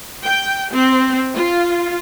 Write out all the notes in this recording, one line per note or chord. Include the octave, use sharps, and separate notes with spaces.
G5
C4
F4